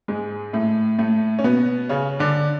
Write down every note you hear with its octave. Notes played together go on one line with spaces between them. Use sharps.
G#2 G#3
A2 A3
A2 A3
C#4
B2 B3
C#3 C#4
D3 D4